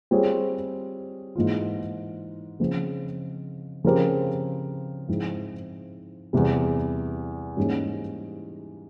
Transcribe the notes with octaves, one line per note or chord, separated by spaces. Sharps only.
G3 C4 F4 G#4 C#5
G#2 E3 A#3 F4
C#3 F3 C4
C#3 F3 C4 G4 A#4
G#2 F3 G#3 C4 E4
E2 C3 G3
G#2 E3 G3 A#3 C#4